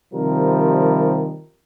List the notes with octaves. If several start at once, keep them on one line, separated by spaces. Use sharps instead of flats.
C3 D#3 F3 G3 A#4